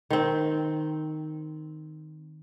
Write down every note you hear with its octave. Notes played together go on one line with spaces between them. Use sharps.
D#3 C4